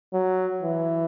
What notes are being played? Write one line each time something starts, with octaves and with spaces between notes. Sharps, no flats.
F#3
E3